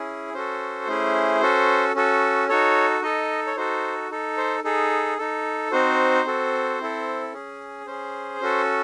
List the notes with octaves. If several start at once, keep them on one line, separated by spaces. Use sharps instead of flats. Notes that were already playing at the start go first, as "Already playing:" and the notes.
Already playing: C#4 E4 G#4
C#4 F#4 A4 C5
A3 C#4 E4 G#4
C#4 F#4 A4
C#4 F#4 A4
D#4 F#4 A4 C#5
D#4 A4 D#5
C#5
D#4 F#4 A4 C5
D#4 A4
C5
D#4 G#4 A4
D#4 A4
C4 D#4 F#4 C5
C4 F#4 A4
C4 E4 A4
C#4 G#4
C#4 G#4 C5
C#4 F#4 A4